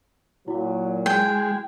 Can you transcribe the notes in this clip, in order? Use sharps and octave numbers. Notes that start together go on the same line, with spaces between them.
A#2 F#3 E4 F#4
G#3 G5